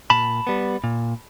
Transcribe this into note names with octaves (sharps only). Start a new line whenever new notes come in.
A#2 A5 B5
G3 B3
A#2